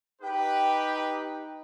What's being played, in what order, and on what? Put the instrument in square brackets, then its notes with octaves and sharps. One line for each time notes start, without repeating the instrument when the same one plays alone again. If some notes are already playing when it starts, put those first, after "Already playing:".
[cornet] D#4 [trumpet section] G4 B4 [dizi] G5